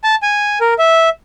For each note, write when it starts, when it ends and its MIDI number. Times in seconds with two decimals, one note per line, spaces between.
0.04 0.15 81
0.23 0.59 80
0.61 0.74 70
0.79 1.09 76